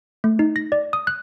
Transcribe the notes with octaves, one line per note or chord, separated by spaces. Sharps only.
A3
D#4
A#6
D5
D#6
F#6